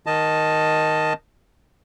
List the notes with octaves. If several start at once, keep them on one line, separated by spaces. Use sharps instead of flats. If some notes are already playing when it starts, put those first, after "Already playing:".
D#3 D#5 A5